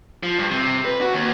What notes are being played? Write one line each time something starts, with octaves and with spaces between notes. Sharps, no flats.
F3
G2
C3
B4
F#4
D#2